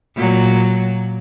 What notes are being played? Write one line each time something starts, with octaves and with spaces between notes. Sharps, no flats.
A#2 F#3